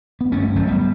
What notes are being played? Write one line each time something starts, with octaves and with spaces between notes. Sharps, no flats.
B3
G1 A3 C#4
G1 F#3 A3
G3 B3